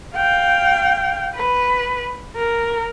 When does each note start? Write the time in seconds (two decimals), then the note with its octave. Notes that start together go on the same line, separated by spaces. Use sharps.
0.16 F5 G5
1.36 B4
2.36 A#4